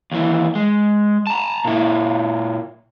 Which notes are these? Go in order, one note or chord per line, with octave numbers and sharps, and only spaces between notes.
D#2 E3
G#3
A5 A#5
A#2 E4